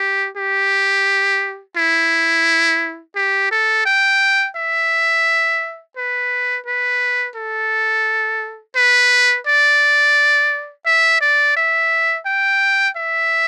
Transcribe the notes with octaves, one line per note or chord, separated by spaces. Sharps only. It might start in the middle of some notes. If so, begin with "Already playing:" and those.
Already playing: G4
G4
E4
G4
A4
G5
E5
B4
B4
A4
B4
D5
E5
D5
E5
G5
E5